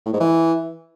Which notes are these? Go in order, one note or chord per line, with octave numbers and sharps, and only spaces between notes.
A2
G#2
E3